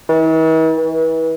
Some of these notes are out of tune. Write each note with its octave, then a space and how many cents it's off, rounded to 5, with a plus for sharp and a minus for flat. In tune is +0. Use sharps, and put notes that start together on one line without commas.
E3 -45
E3 -30